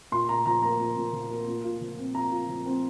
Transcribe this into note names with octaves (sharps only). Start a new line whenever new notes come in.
A#2 C6
A#2 A#5
F3 A#5
A#3 A#5
A#2
A#2
F3
A#3
A#2
F4
F3
C4
A#2 A#5
F4
F3
C4